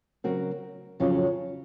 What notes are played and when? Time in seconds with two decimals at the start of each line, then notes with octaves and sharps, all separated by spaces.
0.24 C#3 F#3 C4 F#4 A#4
1.00 F2 C#3 F#3 C#4 F4